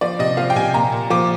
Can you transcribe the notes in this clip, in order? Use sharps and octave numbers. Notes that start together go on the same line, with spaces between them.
F3 D5
C3 D#5
F3 F5
G5
C3 G#5
A#2 A#5
A#2
F3 D6